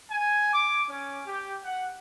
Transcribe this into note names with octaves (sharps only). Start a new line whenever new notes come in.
G#5
D6
C#4
G4
F#5